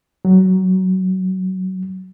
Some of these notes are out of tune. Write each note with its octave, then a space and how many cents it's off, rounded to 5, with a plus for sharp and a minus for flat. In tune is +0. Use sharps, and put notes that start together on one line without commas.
F#3 +15